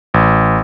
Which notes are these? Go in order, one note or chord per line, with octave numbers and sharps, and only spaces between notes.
A1